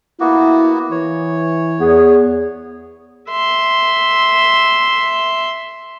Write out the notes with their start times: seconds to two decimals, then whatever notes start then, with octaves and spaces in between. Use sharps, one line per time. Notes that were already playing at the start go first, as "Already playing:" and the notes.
0.20 A#3 B3 E4 F#4
0.91 E3 C#5
1.80 E2 B3 G#4
3.30 E5 C6